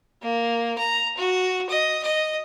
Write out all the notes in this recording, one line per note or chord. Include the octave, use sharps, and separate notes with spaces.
A#3
A#5
F#4
D#5
D#5